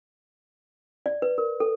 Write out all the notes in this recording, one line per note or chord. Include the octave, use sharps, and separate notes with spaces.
D5
B4
A#4
A4